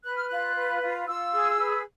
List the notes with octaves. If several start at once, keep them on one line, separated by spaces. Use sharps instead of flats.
B4 F#6
F6
F4 F#6
B4
F4
F4 E6
G#4
B4